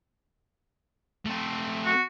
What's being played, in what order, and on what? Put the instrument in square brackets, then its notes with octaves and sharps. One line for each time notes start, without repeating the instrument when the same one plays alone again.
[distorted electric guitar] A3 C4
[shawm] F#4